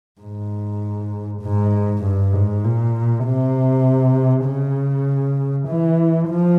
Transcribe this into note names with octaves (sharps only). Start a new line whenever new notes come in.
G#2
G#2
G2
G#2
A#2
C3
C#3
E3
F3